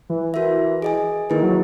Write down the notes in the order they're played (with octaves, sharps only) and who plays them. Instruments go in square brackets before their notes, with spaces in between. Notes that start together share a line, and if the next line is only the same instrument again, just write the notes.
[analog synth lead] E3
[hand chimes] F#4 A#4 E5
G#4 D#5 G#5
[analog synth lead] D#3 [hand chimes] A#3 E4 G#4 B4
[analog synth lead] F#3